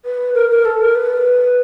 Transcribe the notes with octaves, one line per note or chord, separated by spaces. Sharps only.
B4
A#4
A#4
A4
A#4
B4